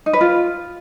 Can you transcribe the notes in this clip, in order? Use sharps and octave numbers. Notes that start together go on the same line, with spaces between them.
D#4
B4
F4